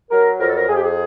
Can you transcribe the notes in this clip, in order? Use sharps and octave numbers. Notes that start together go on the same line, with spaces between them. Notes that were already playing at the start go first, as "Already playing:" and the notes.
F#3 A#4
F2 A#4
A4
A#4
F2 G#4
G4
G#4